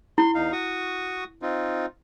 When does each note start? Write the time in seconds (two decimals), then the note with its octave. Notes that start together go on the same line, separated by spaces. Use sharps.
0.18 E4 C6
0.35 E2 D#4 F5
0.52 F#4 C#6 D#6
1.42 C4 D#4 F4